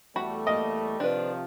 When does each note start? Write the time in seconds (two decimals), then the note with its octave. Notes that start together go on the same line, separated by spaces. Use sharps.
0.16 E2 G3 A3 F#4 B5
0.47 A#3 D#5
1.00 C3 D#3 F3 D4 B4